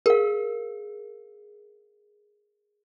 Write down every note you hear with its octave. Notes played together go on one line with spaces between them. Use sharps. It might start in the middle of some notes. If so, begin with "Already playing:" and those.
G#4 A#4 F5